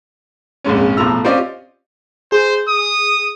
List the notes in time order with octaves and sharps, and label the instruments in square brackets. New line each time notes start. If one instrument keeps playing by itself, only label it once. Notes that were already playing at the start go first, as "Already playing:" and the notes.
[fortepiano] A#1 F2 G#2 C#4
B1 A2 F3 A#5 E6
C4 C#4 F4 G4 D5 D#5
[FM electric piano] G#4 [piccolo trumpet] C5
[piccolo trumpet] D#6